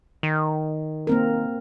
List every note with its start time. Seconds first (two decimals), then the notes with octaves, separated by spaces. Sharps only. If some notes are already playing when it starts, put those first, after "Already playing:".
0.23 D#3
1.07 A#3 C4 A#4